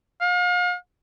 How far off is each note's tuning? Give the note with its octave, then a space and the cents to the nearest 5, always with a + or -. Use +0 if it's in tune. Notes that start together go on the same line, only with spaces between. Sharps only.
F5 +40